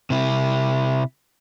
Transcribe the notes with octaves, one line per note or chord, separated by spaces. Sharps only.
C3 E4